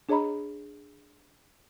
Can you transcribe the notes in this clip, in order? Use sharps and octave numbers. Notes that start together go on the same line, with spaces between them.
D4 G#4 C#5 D#5 A#5 B5